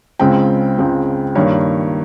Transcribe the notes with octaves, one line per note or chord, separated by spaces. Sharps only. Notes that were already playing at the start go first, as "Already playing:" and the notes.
C#2 C#3 G#3 C4 G5
C#2 C#3 G#3 C4
G2 D#3 A#3 C#5